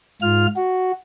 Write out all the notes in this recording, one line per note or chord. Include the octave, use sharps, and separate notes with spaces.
G#2 F4 F6
F#4